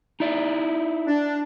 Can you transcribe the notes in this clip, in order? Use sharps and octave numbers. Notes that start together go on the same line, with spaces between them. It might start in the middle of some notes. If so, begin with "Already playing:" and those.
D#4 E4 D5
D4